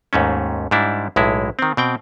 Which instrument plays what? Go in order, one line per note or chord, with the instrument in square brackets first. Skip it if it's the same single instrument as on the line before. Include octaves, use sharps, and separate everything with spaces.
[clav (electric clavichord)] D#2 G#2 A3 C#4
G#2 G3 D4 E4
B1 A2 G#3 E4
D#3 C4
B2 C4 G5